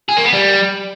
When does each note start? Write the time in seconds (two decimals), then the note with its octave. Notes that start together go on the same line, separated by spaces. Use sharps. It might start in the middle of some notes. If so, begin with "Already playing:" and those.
0.09 G#4
0.17 A#3
0.25 B3
0.33 G3